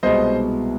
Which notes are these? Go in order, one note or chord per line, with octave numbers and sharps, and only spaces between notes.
C2 B2 G#3 B3 C5 D#5